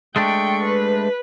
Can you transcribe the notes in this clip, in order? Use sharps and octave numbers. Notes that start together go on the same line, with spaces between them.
G#3 A3 D4 G5 C#6
B4